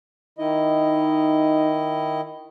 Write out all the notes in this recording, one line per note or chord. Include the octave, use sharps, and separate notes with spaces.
D#3 D#4 E4 D#5